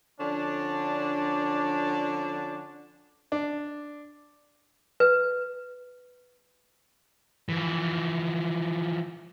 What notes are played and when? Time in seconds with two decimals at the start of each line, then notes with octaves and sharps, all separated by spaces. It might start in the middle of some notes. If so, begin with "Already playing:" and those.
0.20 D3 F3 C#4 D4
3.32 D4
5.00 B4
7.49 E3 F3